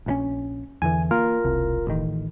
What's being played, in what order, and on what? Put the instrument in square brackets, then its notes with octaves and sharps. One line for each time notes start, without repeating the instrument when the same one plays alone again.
[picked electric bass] A#1 E3 C#4
[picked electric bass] E2 D3 E3 [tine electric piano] G#5
[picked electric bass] A#3 [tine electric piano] F4 A#4
[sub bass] E1 [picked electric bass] C2
[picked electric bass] A1 D#3